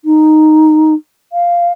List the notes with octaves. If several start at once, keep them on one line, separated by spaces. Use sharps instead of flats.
D#4
F5